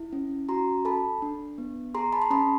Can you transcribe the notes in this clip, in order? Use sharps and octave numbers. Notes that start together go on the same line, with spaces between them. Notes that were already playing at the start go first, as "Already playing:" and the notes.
Already playing: E4
C#4
F#4 A#5 C6
A4 A5 B5
D4
B3
G#4 A#5 C6
A5 B5
C6
C#4 A5 B5